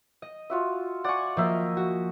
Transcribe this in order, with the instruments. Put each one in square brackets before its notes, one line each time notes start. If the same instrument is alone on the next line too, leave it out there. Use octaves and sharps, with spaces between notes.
[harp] D#5
[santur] F4 F#4 E5
[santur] D5 G#5 [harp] F#5 C#6
[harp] F3 A#3 A#4 [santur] D#5 E5
[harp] F#4